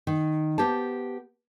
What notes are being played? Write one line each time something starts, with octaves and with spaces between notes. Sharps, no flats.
D#3
B3 G4 C5 A5